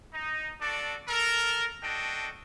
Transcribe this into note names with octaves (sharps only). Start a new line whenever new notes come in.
D#4
D4 F#4 A4 D5
A4 A#4
D4 F#4 A4 D#5 G5